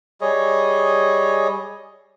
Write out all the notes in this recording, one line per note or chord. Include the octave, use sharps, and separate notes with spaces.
G3 G#4 C#5 D#5